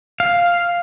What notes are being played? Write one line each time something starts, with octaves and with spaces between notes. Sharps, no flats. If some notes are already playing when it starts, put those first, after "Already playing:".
F5